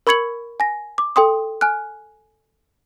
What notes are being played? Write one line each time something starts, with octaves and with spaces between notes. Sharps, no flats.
A#4 B5 C#6 G#6 C#7 F#7
G#5 A#6
D6
A4 G5 C6 D#6
G#5 F6 F#6